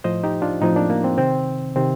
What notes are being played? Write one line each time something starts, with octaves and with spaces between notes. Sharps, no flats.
A2 F3 C5 D#5
D#4 G4
D4 F4
A2 F3 C4 D#4
A#3 D4
A#3
C4
C3 D#3 C4
C3 D#3 C4